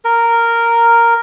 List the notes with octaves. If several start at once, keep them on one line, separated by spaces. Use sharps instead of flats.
A#4